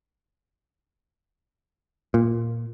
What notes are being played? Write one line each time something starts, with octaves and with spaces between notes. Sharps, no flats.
A#2